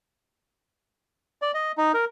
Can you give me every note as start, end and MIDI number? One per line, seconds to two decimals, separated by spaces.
1.42 1.52 74
1.54 1.72 75
1.78 1.92 63
1.94 2.05 70